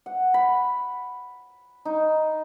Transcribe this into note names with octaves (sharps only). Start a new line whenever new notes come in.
F#5
B5
D#4